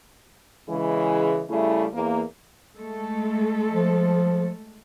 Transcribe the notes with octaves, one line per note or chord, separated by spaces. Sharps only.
C#3 E3 G#3
C#3 G3 A3 E4
E2 A#3
G#3 A3 A4
F3